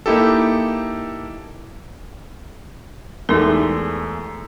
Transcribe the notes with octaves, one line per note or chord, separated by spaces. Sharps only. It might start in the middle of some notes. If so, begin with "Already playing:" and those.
A#3 D#4 E4 G4 A4
E2 G#3 A3 D#4 G4 A#4